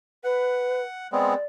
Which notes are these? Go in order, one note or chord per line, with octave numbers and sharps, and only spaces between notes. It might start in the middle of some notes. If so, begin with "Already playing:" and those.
B4 F#5
G#3 B3 C4 D5